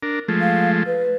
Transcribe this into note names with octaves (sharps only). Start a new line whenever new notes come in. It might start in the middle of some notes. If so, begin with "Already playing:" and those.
D4 A#4
F3 G#3 A3
F5
B4